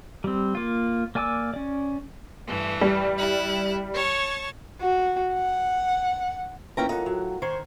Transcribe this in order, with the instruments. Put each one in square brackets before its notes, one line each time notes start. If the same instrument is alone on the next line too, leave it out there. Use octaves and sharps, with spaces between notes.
[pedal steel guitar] G3 C4
A#3 F4
A#3 D5 G#5 D6 E6
C#4 D5
[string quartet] G2 E3 A3
[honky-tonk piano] G3
[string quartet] E4 F#6
C#5 A5 C#6
F#4
F#5
[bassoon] E3 [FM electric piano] A#3 F4 [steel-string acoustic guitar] C#4 G5 A#5
[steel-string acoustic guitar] E2 D#4 [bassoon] A2 [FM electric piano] F4 A#4 F#5
[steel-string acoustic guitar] F#3
[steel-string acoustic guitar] D#3 [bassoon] C5 [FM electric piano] C6 C#6 G#6